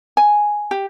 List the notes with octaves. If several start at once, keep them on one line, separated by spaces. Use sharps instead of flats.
G#5
G4